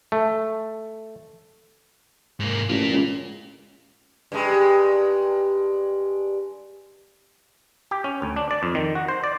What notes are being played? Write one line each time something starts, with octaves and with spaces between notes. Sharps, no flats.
A3
G#2 A#3
A1 A#3 F4
C#2
G2 G#3
G4
C#4
D2
D4
D5
F2
D#3
F#4
C5
D5